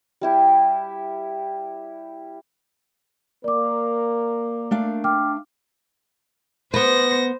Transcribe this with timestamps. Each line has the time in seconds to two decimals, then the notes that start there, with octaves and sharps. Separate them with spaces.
0.21 G3 E4 G4
3.44 A#3 A#4 D5 D6
4.71 A3 D4 F5
5.04 G5 D6 F6
6.74 B3 B4 C5 A#6